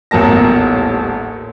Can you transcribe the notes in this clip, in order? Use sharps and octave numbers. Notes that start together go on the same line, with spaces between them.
D#1 A1 E2 A#4 A5 A#6